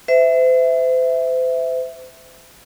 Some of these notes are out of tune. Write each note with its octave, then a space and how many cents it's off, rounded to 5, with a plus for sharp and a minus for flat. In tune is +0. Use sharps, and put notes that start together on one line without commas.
C5 -40 E5 +0